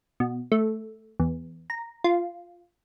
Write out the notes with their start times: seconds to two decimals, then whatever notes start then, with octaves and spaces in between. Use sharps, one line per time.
0.20 B2
0.52 A3
1.20 E2
1.70 A#5
2.04 F4